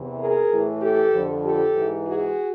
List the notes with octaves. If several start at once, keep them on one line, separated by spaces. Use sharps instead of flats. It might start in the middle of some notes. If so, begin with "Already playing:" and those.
Already playing: E2 C3 E3
G#4 A#4
A2 E3
G4 A4
F2 D3 F3
G4 A4
G#2 E3
F#4 G#4